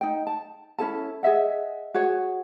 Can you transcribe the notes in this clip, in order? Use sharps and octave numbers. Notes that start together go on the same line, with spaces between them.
D#4 G5
A5
C#4 E4 A4 A5
G#4 D#5 E5 F#5
F#4 G#4 C#5